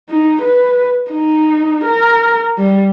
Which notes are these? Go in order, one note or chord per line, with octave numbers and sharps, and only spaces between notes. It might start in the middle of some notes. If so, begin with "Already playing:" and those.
D#4
B4
D#4
A#4
G3